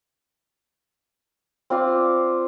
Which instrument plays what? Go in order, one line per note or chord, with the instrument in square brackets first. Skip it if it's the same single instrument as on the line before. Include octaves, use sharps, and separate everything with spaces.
[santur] C4 F4 D5